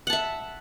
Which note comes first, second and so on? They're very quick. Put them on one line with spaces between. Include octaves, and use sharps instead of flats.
F#5 A5 E5